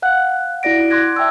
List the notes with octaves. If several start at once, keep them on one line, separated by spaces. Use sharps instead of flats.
F5 F#5 F#6
E4 F#4 D5 A#6 D7
C6 D6 F#6 G#6 A#6
E5 G5 A5 E6